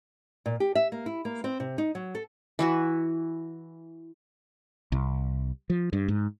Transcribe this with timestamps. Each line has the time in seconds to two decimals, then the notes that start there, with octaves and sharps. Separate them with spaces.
0.46 A#2
0.60 G4
0.75 E5
0.92 A#3
1.06 E4
1.25 A#3
1.44 C4
1.60 C3
1.78 D#4
1.95 F#3
2.15 A4
2.59 E3 E4 F#4
4.92 C2
5.70 F3
5.93 G2
6.08 G#2